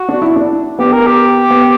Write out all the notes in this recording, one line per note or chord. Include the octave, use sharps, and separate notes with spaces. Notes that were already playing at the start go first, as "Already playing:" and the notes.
Already playing: F#4
D4
E4
D4
B3 G4
A#4
G4
B3